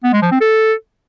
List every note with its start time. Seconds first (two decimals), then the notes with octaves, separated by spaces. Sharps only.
0.04 B3
0.13 G#3
0.23 F3
0.32 C4
0.41 A4